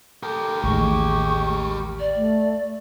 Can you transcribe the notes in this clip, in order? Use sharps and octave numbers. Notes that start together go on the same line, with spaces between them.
G4 A4 A#4
A1 D#2 G#3 C#6
D5
A3